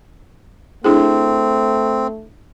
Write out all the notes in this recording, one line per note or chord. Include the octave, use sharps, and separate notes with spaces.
A3 C4 D4 E4 G#4